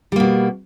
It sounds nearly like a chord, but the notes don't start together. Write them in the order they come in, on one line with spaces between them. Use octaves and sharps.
G3 A#3 B2